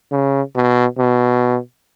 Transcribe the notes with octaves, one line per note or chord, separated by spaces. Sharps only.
C#3
B2
B2